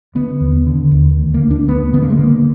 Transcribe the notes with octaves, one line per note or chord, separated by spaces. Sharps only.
D3 B3
D#2
D3
D#2
D2
A#3
D2
D4
D2 B3
D3 B3
A#3
G#3
D3 A#3